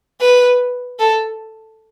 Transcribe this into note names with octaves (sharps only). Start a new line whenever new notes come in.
B4
A4